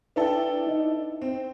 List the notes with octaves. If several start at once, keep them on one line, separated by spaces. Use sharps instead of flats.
D4 E4 A4 B4 G5
D#4 D#5
C4